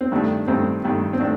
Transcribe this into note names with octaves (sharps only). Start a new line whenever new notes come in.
C4
G2 D#3 A3 D4
G2 D#3 A3 C4
G2 D#3 A3
C4
D#3 A3 D4